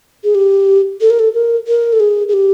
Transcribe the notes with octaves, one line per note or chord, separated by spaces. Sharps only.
G#4
G4
A4
A#4
A4
A#4
A#4
A4
G#4
G#4
G4